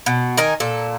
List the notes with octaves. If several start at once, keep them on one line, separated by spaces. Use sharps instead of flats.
B2
D#3 A#4 G#5
A#2 A4